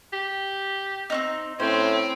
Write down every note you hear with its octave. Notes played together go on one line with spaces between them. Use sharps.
G4
C4 C#4 D#4
A2 C4 C#4 C5